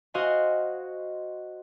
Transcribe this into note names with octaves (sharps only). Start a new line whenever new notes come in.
F#4 C5 D#5 F5 F#5 G#5